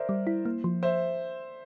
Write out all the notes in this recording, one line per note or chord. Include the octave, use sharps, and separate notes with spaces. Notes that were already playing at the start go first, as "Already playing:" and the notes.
Already playing: A#4 C5 D5 E5
G3
E4
A#3
F3
C5 E5